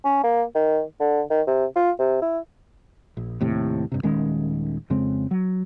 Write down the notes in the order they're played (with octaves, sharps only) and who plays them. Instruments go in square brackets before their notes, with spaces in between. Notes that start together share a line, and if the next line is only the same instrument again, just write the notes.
[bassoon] C#4
A#3
D#3
D3
D#3
C3
F4
C3
E4
[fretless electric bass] A#1
D#2 A2 C3
G2 C3
D#1 D#3 G#3 C#4
F2 C#3 G#3 C4
F#3